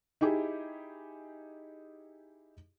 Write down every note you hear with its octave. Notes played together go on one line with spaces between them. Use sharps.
D#4 E4 G4 G#4